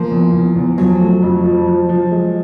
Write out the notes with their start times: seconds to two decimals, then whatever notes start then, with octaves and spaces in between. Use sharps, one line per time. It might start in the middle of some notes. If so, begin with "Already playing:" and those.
Already playing: F3 A#3
0.11 E2
0.33 E2
0.56 E2
0.78 F3 F#3
1.00 A3
1.23 F2
1.44 F3
1.67 F3
1.89 F3
2.11 G#3